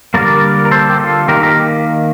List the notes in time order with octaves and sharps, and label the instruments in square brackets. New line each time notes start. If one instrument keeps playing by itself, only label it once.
[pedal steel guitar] D3 G3 A#3 A#4 D5
A#4
A4 C5
G4
F4 A4
D#3 A#3 G4 A#4
G4 A#4